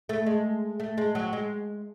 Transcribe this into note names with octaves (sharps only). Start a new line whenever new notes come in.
A3
G#3
A3
G#3
F#3
G#3